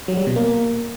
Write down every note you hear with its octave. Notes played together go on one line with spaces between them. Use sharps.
F#3
G3
B2
A#3